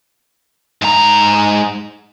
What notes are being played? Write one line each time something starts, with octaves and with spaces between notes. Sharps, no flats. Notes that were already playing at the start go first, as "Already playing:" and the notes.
G#2 A#5